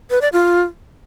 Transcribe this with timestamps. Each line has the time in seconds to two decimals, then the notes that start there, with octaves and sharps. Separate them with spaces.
0.10 B4
0.21 D5
0.33 F4